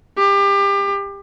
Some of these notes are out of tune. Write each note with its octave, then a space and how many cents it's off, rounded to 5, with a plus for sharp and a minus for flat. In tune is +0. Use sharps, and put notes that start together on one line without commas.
G4 +30